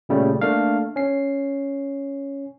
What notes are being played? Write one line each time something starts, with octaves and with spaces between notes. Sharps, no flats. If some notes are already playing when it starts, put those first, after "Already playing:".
A#2 C#3 G3 A3
A3 A#3 D4 F5
C#4 C7